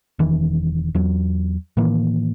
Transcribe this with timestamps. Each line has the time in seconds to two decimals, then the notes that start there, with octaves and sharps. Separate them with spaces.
0.19 E1 D#3 E3
0.95 E2 F#3
1.77 A2 D#3 E3 A#3